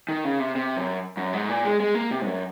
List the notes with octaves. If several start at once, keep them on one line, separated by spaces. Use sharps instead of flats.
D#3
C#3
C3
C3
F#2
F#2
G#2
A#2
G#3
G#3
A#3
C3
G#2
F#2